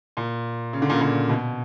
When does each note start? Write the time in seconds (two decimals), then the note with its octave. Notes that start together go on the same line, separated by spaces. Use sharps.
0.17 A#2
0.73 C#3
0.82 D3
0.89 A#2 C#3
1.01 A#2
1.29 B2